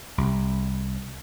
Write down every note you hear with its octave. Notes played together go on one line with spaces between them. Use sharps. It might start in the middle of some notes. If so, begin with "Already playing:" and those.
C2